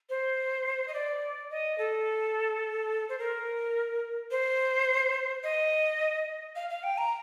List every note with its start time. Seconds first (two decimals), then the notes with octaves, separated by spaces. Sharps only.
0.10 C5
0.88 D#5
0.94 D5
1.50 D#5
1.78 A4
3.09 C5
3.19 A#4
4.31 C5
5.44 D#5
6.56 F5
6.70 F5
6.83 G5
6.98 A#5